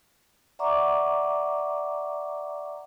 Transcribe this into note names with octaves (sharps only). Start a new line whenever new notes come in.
D5 E5 F#5 A#5 C#6 D6